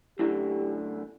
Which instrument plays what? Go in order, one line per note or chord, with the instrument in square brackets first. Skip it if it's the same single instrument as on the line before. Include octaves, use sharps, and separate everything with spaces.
[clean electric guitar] F#2 A2 D3 [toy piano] E4 [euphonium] G4